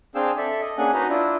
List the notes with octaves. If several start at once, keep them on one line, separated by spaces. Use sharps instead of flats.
C4 D4 G#4 F5 G5 E6
A4 D5 E5
D#5
A#3 C#4 D4 G#4 F#5 G#5
D#4 F#4 B4 D#5 A#5
D4 E4 F4